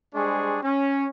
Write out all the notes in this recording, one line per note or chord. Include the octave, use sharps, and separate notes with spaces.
G3 G#3 D4 G#4 C5 C#6
C#4